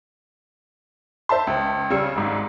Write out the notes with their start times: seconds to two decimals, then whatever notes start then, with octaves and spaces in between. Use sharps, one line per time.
1.29 C5 E5 A5 C6
1.47 C#2
1.90 C#3 G3 E6 C#7
2.16 G#1 G#2